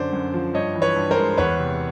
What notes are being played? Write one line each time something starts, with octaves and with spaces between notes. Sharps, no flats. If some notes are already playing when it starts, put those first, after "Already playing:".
Already playing: F#2 D3 C5 D5
F#2
F3
G2 C#5 D#5
E3
B4 C#5
G2
A#4 C5
G#3
E2 B4 C#5
C3